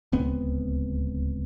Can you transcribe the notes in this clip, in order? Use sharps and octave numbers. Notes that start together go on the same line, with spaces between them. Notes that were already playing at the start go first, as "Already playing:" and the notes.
D1 C#2 B3 C4